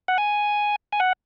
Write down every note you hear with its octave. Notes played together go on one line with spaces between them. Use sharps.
F#5
G#5
G#5
F#5